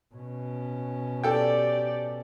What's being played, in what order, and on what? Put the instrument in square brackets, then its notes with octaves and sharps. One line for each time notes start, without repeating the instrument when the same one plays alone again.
[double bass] B2 C#4
[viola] G4 D5 [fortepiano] A4 G5